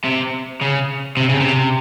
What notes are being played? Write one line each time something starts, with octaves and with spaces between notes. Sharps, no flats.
C3
C#3
C3
C#3
C3